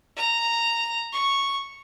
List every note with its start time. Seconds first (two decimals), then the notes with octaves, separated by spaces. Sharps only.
0.17 A#5
1.13 C#6